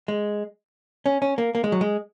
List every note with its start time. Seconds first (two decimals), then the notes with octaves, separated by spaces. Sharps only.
0.08 G#3
1.06 C#4
1.22 C#4
1.38 A#3
1.55 A#3
1.64 G#3
1.72 F#3
1.81 G#3